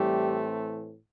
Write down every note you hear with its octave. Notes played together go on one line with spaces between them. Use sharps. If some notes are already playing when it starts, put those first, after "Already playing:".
Already playing: A2 E3 G3 A3 C4 G4